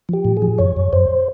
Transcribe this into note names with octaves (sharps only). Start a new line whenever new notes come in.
F3 G4
A2
G#4
F3
F#2 C#5
F#2
F#2 C5